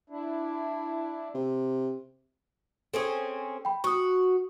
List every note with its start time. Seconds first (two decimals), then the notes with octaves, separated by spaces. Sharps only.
0.10 D4 E4
1.34 C3
2.94 C4 C#4 G#4 A4
3.65 G5 B5
3.84 F#4 C#6 D#6